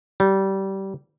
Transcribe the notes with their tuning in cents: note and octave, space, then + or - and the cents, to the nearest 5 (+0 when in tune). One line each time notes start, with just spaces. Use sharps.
G3 -20